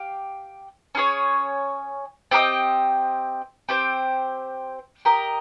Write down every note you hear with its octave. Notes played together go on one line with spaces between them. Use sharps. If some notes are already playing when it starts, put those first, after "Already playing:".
Already playing: G4 F5
C#4 G#4 C#5
C4 G4 A#4 D#5
C4 G4 C5
G4 A#4 D#5